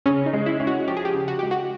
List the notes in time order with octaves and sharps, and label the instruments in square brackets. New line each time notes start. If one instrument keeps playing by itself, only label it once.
[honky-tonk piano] C#3 [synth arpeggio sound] C#4
[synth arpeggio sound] D#4
[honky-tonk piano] G#3
[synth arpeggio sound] E4
[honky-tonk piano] C#4
[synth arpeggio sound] F#4
[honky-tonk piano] F3 [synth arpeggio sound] G4
[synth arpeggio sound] G#4
G4
[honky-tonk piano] C#3
[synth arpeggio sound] F#4
[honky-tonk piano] G#3 [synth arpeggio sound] G4
[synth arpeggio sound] F#4